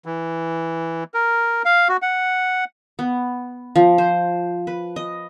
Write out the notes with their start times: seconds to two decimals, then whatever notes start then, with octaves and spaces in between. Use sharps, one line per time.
0.05 E3
1.14 A#4
1.65 F5
1.89 F#4
2.02 F#5
2.99 B3
3.76 F3
3.98 C5
4.67 B4
4.96 D#5